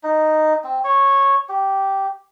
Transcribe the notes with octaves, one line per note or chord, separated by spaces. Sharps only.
D#4
C4
C#5
G4